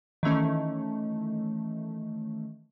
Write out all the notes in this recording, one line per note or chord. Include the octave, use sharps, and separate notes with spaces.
D#3 E3 A3 C#4